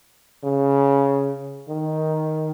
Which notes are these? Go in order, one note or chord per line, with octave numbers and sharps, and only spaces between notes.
C#3
D#3